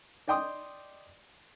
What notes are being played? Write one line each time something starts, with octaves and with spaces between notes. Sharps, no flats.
D5 D#5 G5 C6 D#6